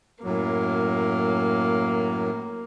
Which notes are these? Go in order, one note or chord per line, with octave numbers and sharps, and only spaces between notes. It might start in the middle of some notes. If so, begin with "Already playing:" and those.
F#2 A2 F#3 A#3